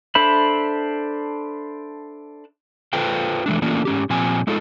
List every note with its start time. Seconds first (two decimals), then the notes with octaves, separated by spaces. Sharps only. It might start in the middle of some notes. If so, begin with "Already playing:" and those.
0.15 D4 A4 C5 E5 B5
2.93 F4 A4 B4 C5 F5 G5
3.46 E3 G#3 A3 D4
3.62 E3 A3 A#3 C#4 D4 F4
3.85 G#2 C#4 G4
4.10 A#2 F3 C4 G#5
4.47 G#3 D#4 F4 A4